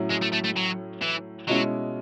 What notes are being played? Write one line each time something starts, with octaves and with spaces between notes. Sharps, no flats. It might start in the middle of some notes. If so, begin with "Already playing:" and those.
Already playing: A2 F#3 C#4 E4
G#3
A3
A3
A3
F#3
E3
B2 F#3 G#3 C#4 E4